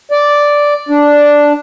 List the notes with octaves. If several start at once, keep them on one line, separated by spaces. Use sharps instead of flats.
D5
D4